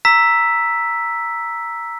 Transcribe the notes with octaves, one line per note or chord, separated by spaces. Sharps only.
A#5 E6 B6